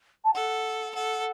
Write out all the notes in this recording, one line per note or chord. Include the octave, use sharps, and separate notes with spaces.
A5
A4 F#5
A4 F#5